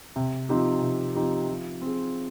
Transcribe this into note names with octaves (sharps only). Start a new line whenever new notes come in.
C3
F3 C4 D#4 G4
C3
F3 C4 D#4 G4
F3
C4 F4 G#4